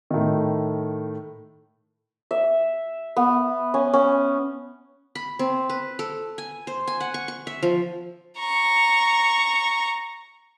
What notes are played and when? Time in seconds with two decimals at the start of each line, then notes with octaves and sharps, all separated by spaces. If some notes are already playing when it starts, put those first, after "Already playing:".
0.10 A2 D#3
2.31 E5
3.16 B3
3.74 C#4
3.93 C#4
5.15 B5
5.39 C4
5.69 B4
5.99 A4
6.38 G#5
6.67 C5
6.87 G#5
7.00 F#5
7.14 C#6
7.28 C#6
7.47 E5
7.63 F3
8.38 A#5 C#6